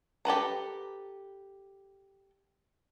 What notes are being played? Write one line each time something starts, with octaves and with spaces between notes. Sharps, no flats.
G4 A4 B4 A#5